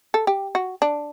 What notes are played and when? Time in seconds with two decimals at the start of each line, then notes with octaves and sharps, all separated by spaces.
0.14 A4
0.27 G4
0.55 F#4
0.82 D4